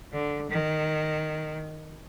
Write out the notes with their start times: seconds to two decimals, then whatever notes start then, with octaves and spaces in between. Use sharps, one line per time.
0.13 D3
0.50 D#3